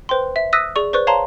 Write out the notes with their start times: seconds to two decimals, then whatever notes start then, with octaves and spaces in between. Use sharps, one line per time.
0.09 B4 C5 G5 C6
0.36 E5
0.53 D#6 E6 F#6 A#6 B6 D#7
0.76 G#4 D5 C#6
0.93 B4 C5 D5 C#6 F#6
1.07 C#5 F5 A5 A#5 C6